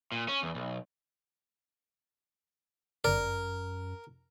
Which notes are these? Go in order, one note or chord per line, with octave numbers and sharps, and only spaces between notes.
A#2
C#4
E2
B1
G1 F#2 A#4 D5